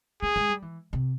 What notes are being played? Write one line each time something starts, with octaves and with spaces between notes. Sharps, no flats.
A#3 G#4
G#3
G3
E3
C3